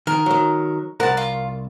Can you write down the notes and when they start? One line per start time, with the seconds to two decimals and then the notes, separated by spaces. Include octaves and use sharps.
0.07 D#3 A#4
0.26 D#3 F#3
1.00 C2 A#4 F#5 A5 A#5
1.17 F4